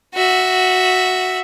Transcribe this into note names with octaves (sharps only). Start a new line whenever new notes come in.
F#4 E5